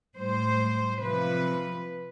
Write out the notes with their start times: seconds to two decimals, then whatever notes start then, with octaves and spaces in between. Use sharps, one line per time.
0.17 A2 G3 C5
1.01 C3 F3 B4